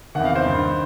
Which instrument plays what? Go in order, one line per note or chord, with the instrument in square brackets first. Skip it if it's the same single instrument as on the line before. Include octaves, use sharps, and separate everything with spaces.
[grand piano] E2 C3 D#3 F#5
F5
C5
G2 D#3